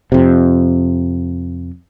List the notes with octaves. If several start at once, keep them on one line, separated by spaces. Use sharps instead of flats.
F2 C3